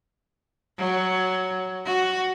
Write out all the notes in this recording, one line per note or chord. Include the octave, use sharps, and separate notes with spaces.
F#3
F#4